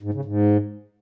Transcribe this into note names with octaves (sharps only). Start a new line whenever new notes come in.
G#2
C#3
G#2